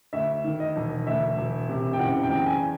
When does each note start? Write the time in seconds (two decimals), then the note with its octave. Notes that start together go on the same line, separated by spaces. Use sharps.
0.13 D2 E5
0.44 D#3
0.60 D#5
0.76 E1
1.06 D2 E5
1.38 E1
1.69 C3
1.93 G5
1.99 F#1 F#5
2.23 G5
2.30 E2
2.46 G#5